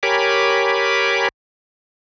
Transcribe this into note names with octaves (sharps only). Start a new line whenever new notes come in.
G4 A#4 C#5 G#5 B5 D6